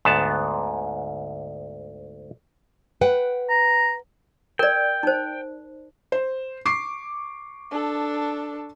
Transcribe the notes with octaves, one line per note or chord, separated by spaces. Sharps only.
D2 G#2 B3 A5
B4 F#5 G5
A#5
A#4 D5 G5
D#4 C5
C5
C#6 D6 C7
D4 A4